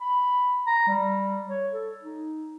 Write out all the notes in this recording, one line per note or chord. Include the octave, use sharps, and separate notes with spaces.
B5
A#5
G3
C#5
A4
D#4